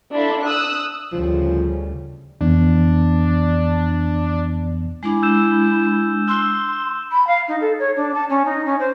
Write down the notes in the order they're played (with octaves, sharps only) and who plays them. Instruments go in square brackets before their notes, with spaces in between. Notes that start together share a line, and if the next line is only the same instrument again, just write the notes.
[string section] D4 E4 F4 A4
D#6 E6 F#6
[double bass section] D2 C#3 G3 [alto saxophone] F3
[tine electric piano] F2 E3 B3 [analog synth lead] D4
[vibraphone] G#3 D4 [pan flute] E4
[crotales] E6 G6 E7
[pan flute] C6 [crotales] E6 F#6
[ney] B5
F5
D#4
A4
C#5
D4
A5
C#4
D#4
C#4
C5